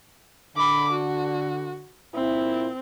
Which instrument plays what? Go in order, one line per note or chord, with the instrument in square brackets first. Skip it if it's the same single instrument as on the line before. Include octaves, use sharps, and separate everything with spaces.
[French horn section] D3 [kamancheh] B5 D6
[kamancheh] F#4
[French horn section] A#2 E4 [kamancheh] C4